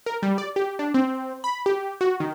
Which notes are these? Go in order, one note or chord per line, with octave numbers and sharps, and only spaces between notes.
A#4
G3
D5
G4
D4
C4
B5
G4
F#4
D#3